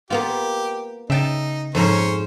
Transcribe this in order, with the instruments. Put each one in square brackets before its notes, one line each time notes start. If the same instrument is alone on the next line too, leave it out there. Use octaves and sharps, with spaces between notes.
[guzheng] A#3 B3 F4 [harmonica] G4
[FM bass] C#3 [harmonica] D#4 [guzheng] E5 G5 A5
[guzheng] F2 G#2 A#5 [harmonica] C#4 C5 C#6